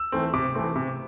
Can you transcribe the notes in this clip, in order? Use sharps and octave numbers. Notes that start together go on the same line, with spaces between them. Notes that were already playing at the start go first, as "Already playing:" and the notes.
Already playing: E6
E3 A3 C4
C3 D6
E3 A3 C4
C3